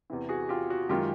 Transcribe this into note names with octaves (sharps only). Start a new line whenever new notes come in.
E2 C3 E3
F#4 G#4
F4 G4
F#4
F#2 D#3 G#3 C#4 F4 G4